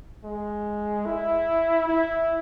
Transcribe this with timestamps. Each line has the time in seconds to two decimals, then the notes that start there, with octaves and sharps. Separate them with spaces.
0.24 G#3
1.06 E4
1.88 E4